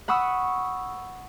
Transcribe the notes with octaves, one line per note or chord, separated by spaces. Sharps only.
F#5 B5 C#6 D#6 E6